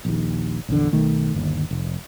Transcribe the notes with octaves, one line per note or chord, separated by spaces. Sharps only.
A#1 D#2
A#1 E2 D3
B1 D#3 A3
G1 D#2
F1